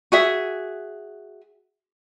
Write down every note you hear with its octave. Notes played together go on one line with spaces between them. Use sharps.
F#4 G#4 E5